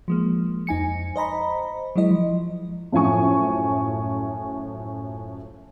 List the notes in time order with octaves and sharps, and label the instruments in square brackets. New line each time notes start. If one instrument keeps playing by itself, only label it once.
[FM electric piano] F3 G#3 A#3
F2 D#4 G#5 C#7
C5 D#5 A#5 B5
F#3 G#3 E4 D#5
F3
[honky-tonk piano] F#2 A2 F3 G#5 C#6